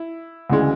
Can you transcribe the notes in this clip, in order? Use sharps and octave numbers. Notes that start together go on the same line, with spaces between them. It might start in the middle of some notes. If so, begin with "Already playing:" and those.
Already playing: E4
D2 C#3 E3 G#3